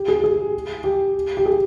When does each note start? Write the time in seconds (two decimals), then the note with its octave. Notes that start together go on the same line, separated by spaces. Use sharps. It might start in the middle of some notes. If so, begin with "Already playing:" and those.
Already playing: G4
0.08 G#4
0.24 G#4
0.84 G4
1.37 G4
1.46 G#4